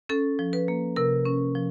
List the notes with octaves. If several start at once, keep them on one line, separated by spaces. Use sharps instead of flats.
C#4 A4
F3
B4
A#3
C3 A#4
C#4
F3